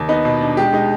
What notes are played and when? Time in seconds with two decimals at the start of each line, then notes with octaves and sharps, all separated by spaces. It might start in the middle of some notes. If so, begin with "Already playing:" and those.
Already playing: D#2
0.09 B3 D#4
0.25 B2
0.41 D4
0.57 G#3 G4
0.73 G#3 D#4